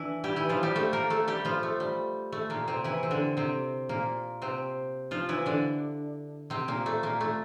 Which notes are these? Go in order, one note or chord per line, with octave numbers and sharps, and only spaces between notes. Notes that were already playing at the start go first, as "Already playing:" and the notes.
Already playing: E3 D4 E4
G3 G4
E3 E4
F3 F4
G3 G4
A3 A4
A#3 A#4
A3 A4
G3 G4
F3 F4
A3
G3
A3
A#2 A#3
C3 C4
E3 E4
C4
D3 D4
C3 C4
A#2 A#3
C3 C4
F3 F4
E3 E4
D3 D4
C3 C4
A#2 A#3
A3
A#2 A#3
A3